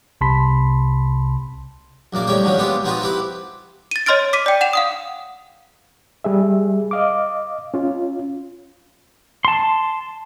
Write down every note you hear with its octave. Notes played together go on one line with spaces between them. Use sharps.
C2 C3 A5 B5 C6 B6
A#1 F#2 A#3 D5
A1 F2 C#3 G3 C#5 G5
D3 D#3 F3 F#3 C#4
G#3 B3 C4 D4 F4 G4
F3 B3 C4 D#4 F4 F#4
C4 E4 G4 B4
A6 D#7
C#5 D#5 C6 F6 A6 D7
D6 B6 D#7
D5 G5
F#5 E7 F7
F5 F#5 D#6
G3 G#4 E5
D#5 F5 D6
C#4 F4
A5 C6